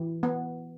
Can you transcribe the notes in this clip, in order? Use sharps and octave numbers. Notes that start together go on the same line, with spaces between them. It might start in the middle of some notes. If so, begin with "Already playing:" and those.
Already playing: E3
B3